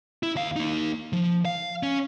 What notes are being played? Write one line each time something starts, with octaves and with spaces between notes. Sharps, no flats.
E4
D#2 F5
A#3 D#4
F3
F5
C#4